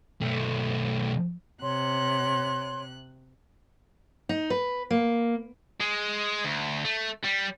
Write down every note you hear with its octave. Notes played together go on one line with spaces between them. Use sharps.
B1 A3
C3 C#5 C6 F#6
D#4
B4
A#3
G#3
D2
A3
G3